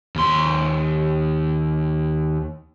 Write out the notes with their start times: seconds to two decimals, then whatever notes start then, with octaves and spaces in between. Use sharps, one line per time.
0.16 D#2 C6